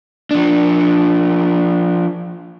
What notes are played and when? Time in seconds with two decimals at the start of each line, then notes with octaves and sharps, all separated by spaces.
0.31 F3 D4